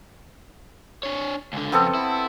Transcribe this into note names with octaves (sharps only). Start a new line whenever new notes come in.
D4 C#5
C#2 D3
F2 C#3 B3 C4 A4
E4